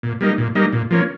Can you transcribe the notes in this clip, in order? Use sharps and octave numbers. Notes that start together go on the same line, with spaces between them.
A#2
G3 A#3 D#4
A#2
G3 A#3 D#4
A#2
F3 A#3 C#4